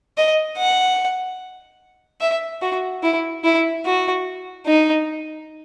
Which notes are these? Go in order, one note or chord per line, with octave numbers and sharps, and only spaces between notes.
D#5
F#5
E5
F#4
E4
E4
F#4
D#4